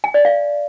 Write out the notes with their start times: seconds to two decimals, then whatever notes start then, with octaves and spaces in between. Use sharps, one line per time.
0.04 G#5
0.14 D5
0.25 F5